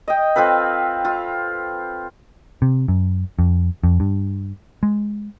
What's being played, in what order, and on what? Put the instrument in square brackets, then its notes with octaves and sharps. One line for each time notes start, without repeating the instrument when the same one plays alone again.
[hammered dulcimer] D#5 G5
C4 F4 A4 B4
F4
[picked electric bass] C3
F#2
F2
F2
G2
G#3